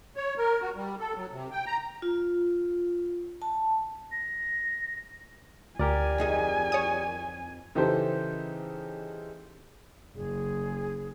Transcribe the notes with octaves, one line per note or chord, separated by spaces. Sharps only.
C#5
A#4
F#4
G3
A4
F#3
C3
G5
A#5
F4
A5
A#6
D2 G4 A#4 D5 G#5
F2 D#4 G#4
C#5 D#6
C#3 E3 D#4 G4 A4 C5
F#1 G#4